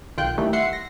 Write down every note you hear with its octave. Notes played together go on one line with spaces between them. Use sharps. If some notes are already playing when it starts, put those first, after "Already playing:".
B1 D#3 F4 G5 F#6 G6
D#3 E3 G3 A3 D#4
E5 F#5 C6 C7 C#7
A#6